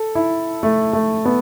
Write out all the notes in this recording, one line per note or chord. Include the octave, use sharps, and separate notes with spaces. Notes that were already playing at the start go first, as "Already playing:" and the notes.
Already playing: A4
E4
A3
A3
B3